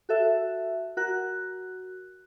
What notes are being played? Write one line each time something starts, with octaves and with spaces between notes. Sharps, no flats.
F#4 A4 E5
F#4 A#4 F#6